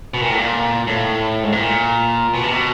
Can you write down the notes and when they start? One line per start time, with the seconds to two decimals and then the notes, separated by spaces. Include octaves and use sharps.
0.14 B2
0.22 A#2
0.30 A2
0.38 A#2
0.87 A2
1.44 G#2
1.52 A2
1.60 A#2
2.34 B2
2.43 C3
2.52 B2